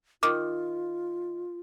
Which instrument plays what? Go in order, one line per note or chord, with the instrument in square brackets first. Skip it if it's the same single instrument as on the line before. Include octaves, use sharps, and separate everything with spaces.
[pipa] D#3 [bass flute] F4 [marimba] D6